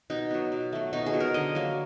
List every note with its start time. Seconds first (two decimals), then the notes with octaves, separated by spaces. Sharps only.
0.10 B2 D#4
0.30 F#3 B3
0.52 B2
0.73 F#3 A3
0.93 B2 D#4
1.06 G#4
1.13 F#3 B3
1.20 A#4
1.34 D3 D#5
1.55 F#3 A#3